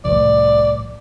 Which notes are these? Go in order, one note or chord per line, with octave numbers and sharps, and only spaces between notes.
C2 A2 F3 D5